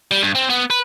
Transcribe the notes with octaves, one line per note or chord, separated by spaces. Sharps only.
G3
G2
C4
B3
B4